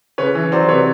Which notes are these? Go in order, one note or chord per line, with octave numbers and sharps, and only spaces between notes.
C#3 B4 C#5
E3
F#3 C5 D5
C3 B4 C#5